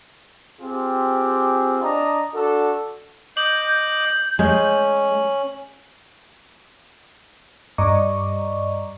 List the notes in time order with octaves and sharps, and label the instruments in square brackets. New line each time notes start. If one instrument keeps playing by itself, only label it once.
[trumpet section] C4 F4 G4 G#4
D4 D#5 A5 A#5
D4 F#4 A4
[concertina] D#5 D6 [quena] G6 [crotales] F#7
[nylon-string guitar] G#3 [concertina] C#4
[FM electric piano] G2 D5 D#5 A#5 C#6 D6